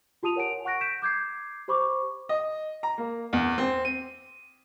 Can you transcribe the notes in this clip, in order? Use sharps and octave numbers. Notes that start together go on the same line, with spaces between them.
F4 G4 A5 D#6 D#7 F7
A#4 C#5 F#5 G#5 D7
F#5 C#6 F#6 A#6 D7
G6 B6 D7 E7
D6 G6 G#6 C7
G4 C5 B5 C#6 D6
D#5
A#5
A#3
E2
C4
D#7